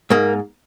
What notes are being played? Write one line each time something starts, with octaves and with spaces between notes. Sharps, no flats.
G#2 A#3